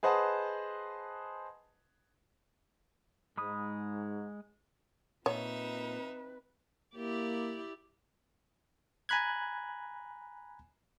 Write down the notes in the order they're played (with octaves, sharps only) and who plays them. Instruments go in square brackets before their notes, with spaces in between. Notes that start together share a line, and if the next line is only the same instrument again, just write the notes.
[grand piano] G#4 B4 C5 D#5 F#5 A5
[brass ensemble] G#2 [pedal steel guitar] G#3 B5 D#6
[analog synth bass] A#2 [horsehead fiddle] C4 B4 [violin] D#4 E5 [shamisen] C#5
[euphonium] A#3 [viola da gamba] E4 G4 D5
[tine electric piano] G#5 A#5 B5 F#6 G#6